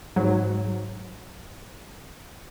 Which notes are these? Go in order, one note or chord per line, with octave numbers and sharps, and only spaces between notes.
G#2 F#3